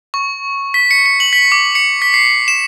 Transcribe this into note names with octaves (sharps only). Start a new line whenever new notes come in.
C#6
B6
C#7
C#7
F#7
B6
D6
C#7
B6
C7
E7